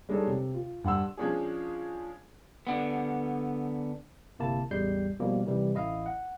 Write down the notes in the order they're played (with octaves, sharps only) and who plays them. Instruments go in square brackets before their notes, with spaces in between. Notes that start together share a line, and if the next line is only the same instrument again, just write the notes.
[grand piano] G3 G#3 D4 D#4 A4 C#5
C3
F4
G2 F#5 C6 E6
[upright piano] F3 G#3 C#4 D4 G#4
[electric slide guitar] D3 B3
[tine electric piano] G1 C3 A#3 E4 A5
A1 E2 G3 G#3 G6 C7
B2 F3 G3 A#3
C3 D#3 E3 G3
A1 E4 D#5 F5
F#5